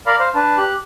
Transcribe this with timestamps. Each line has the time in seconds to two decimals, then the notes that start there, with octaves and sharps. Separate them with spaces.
0.07 A#4 D5 F5 B5
0.20 C5 F5
0.35 D4 B4 A5
0.57 G4 F#6